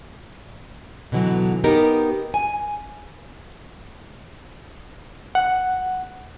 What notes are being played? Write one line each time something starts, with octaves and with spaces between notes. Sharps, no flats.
B2 D3 E3 F#3
B3 D#4 G4 A#4
G#5
F#5